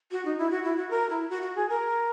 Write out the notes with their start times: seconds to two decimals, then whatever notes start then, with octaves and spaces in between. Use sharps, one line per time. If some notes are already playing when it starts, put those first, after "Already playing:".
0.12 F#4
0.25 D#4
0.38 E4
0.51 F#4
0.64 E4
0.77 F#4
0.90 A#4
1.10 E4
1.30 F#4
1.42 F#4
1.56 G#4
1.69 A#4